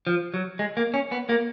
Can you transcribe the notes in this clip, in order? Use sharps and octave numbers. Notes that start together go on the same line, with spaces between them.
F3
F#3
G#3
A#3
C#4
B3
A#3